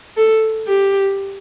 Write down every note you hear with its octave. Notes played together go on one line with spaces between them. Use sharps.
A4
G4